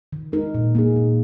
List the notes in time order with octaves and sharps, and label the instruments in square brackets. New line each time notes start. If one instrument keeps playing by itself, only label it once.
[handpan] D#3
G#3 D#4 A#4
A#2
A#3 D#4 G#4
A#2